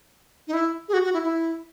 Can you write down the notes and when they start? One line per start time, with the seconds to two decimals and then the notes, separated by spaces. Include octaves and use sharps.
0.48 D#4
0.53 E4
0.88 G#4
0.93 F#4
1.05 F#4
1.13 E4
1.24 E4